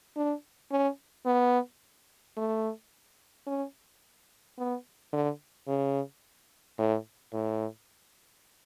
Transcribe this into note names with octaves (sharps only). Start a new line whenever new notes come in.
D4
C#4
B3
A3
C#4
B3
D3
C#3
A2
A2